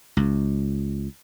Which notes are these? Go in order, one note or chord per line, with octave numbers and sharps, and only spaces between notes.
C#2